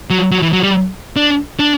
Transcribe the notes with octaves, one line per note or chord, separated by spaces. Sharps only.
F#3
F#3
E3
F#3
G3
D4
D4